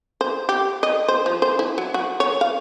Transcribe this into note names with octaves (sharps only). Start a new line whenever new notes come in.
C5
G4
D#5
C5
F3
C5
E4
F#3
F#4
C#5
F5